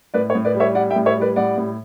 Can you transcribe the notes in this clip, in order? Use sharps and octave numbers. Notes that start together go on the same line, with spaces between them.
A2 B4 D5
C#5
A2
B4 D5
G3
C#5 E5
G3 D5 F#5
E5 G5
A2
C#5 E5
G3 B4 D5
A2 D5 F#5
A2